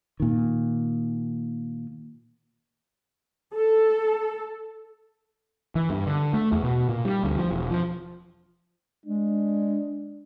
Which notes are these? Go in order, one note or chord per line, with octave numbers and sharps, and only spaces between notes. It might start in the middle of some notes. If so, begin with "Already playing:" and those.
A#2 D#3
A4
E3
G2
D3
A3
E2
B2
A#2
G3
D2
F3
E1
F3
G#3 D4